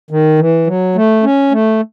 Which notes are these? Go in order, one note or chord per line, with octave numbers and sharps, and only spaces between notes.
D#3
E3
F#3
A3
C#4
A3